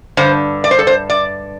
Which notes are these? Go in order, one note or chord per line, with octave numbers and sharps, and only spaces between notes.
G2 D3 C5
D5
C5
A4
C5
D5